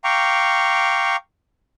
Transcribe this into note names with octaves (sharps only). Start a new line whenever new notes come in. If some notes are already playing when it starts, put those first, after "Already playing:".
F5 G5 A#5 C#6 D6